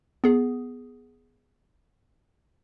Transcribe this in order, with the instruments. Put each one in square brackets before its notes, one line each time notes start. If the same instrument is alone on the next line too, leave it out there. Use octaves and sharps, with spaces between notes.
[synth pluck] B3 G#4